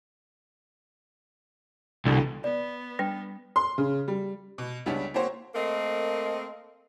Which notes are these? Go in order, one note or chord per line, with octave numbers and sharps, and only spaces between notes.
C2 B2 D3 E3
B3 D5
G3 D4 B4 G5
C6
C#3
G3
B2
C#2 G3 B3 C#4 D4 B6
A#3 C4 F#4 C5 C#5
A3 A#3 C4 A#4 D#5